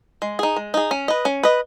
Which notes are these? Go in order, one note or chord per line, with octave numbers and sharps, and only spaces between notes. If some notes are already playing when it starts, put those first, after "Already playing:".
G#3
D#4 G#4
G#3
D#4 G#4
C#4
B4 D#5
C#4
B4 D#5